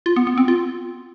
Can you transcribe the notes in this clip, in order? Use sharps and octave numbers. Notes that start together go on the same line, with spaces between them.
F4
B3
B3
C4
F4